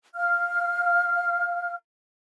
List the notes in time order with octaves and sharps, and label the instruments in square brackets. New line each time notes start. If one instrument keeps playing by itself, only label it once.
[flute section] F5 F6